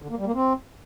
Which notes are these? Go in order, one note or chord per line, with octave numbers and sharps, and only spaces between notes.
D3
A#3
G3
A#3
C4